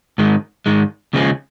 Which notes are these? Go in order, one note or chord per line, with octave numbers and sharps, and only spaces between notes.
G#2 D#3 G#3
G#2 D#3 G#3
D#2 C#3 F3 G#3 C#4